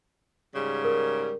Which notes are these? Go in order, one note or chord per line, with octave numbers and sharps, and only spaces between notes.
G#2 C#3 G3
A#4